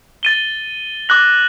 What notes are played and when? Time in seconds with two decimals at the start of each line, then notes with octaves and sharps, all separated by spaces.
0.23 A6 D#7 G7
1.09 D6 F#6 A#6 F#7